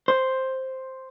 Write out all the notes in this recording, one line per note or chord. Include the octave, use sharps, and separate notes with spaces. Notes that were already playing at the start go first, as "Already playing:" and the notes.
C5